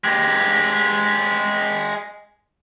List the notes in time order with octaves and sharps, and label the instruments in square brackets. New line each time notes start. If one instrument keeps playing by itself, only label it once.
[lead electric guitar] G#3 G4